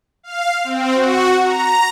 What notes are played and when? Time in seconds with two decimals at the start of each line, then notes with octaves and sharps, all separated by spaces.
0.23 F5
0.64 C4
0.93 F#4
1.42 A#5